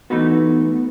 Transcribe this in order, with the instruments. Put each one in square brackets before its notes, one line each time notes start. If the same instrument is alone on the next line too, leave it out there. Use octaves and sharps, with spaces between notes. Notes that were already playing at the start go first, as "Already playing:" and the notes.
[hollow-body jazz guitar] E3 A3 D#4 F#4 B4 [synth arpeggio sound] B3